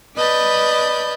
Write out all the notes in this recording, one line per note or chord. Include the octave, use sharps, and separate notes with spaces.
B4 D5 D#5 A5 B5 G6